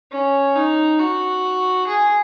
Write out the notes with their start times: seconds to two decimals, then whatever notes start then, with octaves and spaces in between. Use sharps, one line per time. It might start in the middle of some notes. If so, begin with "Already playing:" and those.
0.12 C#4
0.55 D#4
1.00 F#4
1.87 G#4